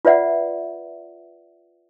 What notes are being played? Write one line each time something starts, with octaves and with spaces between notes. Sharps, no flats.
F4 B4 D5 E5 F#5